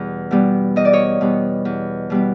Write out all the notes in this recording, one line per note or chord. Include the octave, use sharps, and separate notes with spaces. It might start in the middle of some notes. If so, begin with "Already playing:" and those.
Already playing: E2 B2 G3
B2 G3 B3
E2 D#5
D5
C#5 D#5
B2 G3 B3
E2
B2 G3 B3